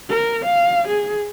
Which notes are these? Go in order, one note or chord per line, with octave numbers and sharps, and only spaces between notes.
A#4
F5
G#4